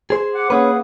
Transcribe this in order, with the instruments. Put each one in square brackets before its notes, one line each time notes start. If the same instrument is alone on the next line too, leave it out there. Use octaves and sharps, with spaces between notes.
[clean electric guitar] G#4 C5
[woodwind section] F#5 D6
[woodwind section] A#3 G#4 F#5 [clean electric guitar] C#4 B4